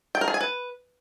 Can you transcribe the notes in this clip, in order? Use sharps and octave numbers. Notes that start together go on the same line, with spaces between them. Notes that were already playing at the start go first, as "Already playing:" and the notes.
G5
A#4
G#4
G#5
B4